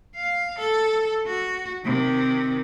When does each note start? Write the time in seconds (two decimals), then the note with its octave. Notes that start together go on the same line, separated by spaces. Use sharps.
0.16 F5
0.59 A4
1.27 F#4
1.85 C3 D#3